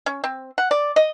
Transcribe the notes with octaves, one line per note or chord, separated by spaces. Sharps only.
C#4
C4
F#5
D5
D#5